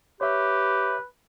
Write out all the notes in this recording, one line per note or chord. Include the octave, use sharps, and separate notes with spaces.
G4 B4 C#5 E5